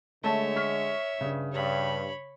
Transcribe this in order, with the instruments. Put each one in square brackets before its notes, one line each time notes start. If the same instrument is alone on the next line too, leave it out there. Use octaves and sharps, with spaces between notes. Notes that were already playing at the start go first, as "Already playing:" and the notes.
[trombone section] D3 G#3 [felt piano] A3 A5 [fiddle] C#5 E5
[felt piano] C#6 F6 B6
[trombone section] G2 [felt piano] C#3
[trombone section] G2 [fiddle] C#5 B5